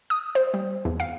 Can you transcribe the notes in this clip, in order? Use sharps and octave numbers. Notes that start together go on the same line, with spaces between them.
D#6
C5
G3
E2
F5